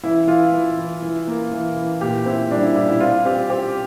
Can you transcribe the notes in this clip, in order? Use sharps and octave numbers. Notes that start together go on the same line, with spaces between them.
E3 E4
E3 F4
E3
E3
E3
A#3
E3
E3
A#2 G4
C4 E4
G3 D4
E4
G3 E4
E4
C4 F4
C4 G4
C4 G4